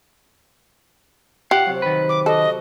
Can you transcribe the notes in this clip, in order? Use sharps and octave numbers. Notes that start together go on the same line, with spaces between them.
F4 G4 F5 F#5
C3 F#3
D#3 B4
D6
F#4 A4 D#5